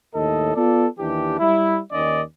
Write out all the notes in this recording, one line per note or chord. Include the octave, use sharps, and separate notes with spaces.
D#2 A2 A4 D#5
B3 F4 A4 D5
D#2 E3 D4 G4
G3 E4
D#2 D#3 C#4 D5 D#5